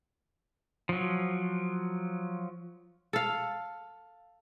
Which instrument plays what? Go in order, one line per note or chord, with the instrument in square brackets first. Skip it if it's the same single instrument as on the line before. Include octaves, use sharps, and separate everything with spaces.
[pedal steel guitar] F3 F#3
[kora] A4 F5